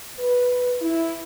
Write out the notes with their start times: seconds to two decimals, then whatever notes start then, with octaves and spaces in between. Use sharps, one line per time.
0.19 B4
0.81 E4